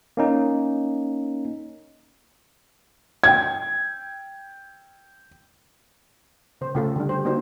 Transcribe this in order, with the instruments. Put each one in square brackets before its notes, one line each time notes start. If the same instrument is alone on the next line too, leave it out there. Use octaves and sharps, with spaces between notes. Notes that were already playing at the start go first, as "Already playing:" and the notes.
[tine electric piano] A#3 C#4 D#4
[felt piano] G5 G#6
[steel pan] C#3 C5
C#3 A3 F4 A4
D3 G3 D4
G4 C5
A#3 D4 D#4 F#4 C5